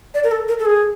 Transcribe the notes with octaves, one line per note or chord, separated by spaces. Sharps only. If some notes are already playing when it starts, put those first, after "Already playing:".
D5
A#4
A4
A#4
A4
G#4